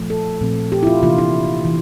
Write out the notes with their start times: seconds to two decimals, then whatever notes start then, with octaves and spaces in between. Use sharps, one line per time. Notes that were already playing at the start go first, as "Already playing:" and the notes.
Already playing: A#2 F3 A3
0.10 A4
0.40 A#2 F3 A3 C4
0.72 G4
0.83 E4
0.87 F4
1.03 C3 E3 A#3 D4 F4
1.18 E4
1.65 E3